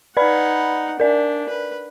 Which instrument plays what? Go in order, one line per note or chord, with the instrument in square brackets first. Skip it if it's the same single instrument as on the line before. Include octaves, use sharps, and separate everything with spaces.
[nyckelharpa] D#4 F#5 [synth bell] B4 D5 B5
[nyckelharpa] D4 [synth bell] A#4 D5
[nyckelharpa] B4